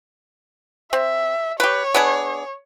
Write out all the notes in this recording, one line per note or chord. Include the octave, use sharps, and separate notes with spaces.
C4 E5
G4 B4 C#5
B3 D4 G#4